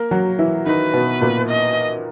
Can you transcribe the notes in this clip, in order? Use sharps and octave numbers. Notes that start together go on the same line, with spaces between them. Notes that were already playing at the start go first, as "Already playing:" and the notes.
Already playing: A#3 A#4
F#3 F#4
E3 E4
D#3 D#4 B4
B2 B3
A#2 A#3
D#5